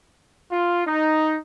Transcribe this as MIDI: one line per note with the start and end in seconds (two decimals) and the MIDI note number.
0.52 0.83 65
0.87 1.39 63